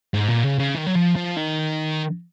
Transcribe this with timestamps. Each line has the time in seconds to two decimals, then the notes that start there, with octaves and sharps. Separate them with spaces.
0.14 G#2
0.29 A#2
0.44 C#3
0.59 C#3
0.75 D#3
0.87 F#3
0.95 F3
1.16 F3
1.37 D#3